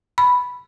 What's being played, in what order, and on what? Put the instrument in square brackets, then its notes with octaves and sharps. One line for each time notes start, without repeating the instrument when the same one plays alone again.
[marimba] B5